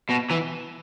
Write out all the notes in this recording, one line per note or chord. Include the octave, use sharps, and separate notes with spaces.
B2
E3